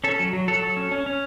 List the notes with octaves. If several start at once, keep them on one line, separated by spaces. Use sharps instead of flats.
C#4 A4
F#3
F#3
F#3 A4
F#3
C#4
C#4
C#4